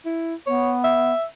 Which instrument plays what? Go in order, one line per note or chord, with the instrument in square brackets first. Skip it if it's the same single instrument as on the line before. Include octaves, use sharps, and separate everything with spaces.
[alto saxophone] E4
[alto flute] B3 [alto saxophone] C#5
[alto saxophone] E5